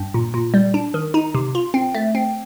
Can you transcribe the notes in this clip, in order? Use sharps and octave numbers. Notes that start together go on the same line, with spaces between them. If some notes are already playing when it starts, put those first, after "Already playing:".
Already playing: G2
A#2
A#2
G3
D4
D#3
D#4
C3
F4
C4
A3
C4